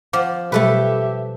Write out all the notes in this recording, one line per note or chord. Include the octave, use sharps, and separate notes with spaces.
F3 F#5 D6
B2 F#3 G3 A3 G4 A4 B4 E5